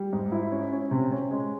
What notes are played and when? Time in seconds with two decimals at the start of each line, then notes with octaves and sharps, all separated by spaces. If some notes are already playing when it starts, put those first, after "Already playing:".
Already playing: G3
0.13 G#2
0.32 E4
0.52 C#4
0.72 C#4
0.91 C3
1.12 C#4
1.31 G#3